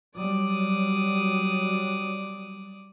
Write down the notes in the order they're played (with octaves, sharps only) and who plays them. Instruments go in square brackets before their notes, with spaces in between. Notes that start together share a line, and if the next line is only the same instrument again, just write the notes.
[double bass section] F#3 G3 [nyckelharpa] D5 D#6